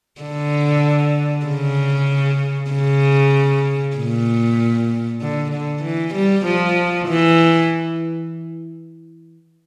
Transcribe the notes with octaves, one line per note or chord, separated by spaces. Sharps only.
D3
C#3
C#3
A#2
D3
D3
E3
G3
F3
E3